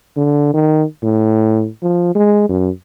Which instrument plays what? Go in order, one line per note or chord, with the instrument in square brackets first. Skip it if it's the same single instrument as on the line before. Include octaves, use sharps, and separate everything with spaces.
[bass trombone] D3
D#3
A2
F3
G#3
F#2